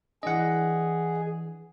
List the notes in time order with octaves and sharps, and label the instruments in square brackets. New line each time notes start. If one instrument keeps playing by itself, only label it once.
[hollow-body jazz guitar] E3 D4 [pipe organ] G#4 [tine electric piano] D#5 F#5